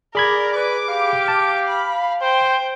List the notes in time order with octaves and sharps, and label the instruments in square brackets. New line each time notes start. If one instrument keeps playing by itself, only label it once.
[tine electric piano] G#4 B5 G#6 [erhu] A#4 [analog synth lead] D5
[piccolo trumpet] B4 [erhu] D6
[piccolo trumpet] G4 [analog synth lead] F5
[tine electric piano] A5
[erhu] B5
[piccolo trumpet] C5 [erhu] G5